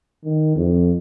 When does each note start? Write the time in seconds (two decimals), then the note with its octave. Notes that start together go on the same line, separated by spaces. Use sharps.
0.24 D#3
0.56 F2